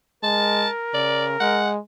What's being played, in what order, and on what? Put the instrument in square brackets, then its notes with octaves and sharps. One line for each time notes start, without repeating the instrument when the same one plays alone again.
[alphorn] G#3 [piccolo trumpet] A#4 [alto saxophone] A5
[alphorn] C#3 [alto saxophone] D5
[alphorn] G#3 [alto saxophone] F#5